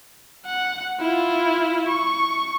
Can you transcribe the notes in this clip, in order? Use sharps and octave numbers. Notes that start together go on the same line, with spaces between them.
F#5
E4 F4
C#6